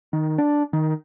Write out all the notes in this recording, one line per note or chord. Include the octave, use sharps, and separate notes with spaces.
D#3
D4
D#3